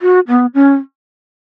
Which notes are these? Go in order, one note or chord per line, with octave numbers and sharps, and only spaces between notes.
F#4
B3
C#4